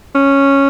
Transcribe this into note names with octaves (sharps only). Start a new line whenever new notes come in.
C#4